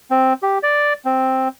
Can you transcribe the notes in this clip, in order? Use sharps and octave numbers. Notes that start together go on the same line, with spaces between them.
C4
G4
D5
C4